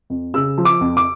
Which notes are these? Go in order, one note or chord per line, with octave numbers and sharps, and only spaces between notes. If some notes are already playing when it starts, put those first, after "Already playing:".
F2
C#3 E6
F3
D6
F2
D6